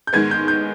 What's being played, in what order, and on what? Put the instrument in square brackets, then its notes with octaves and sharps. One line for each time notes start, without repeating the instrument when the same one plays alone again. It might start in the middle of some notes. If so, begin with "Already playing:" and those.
[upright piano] G6
[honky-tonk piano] G#2 D#3 G#3 B3 [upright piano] G#6
[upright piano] G6
G6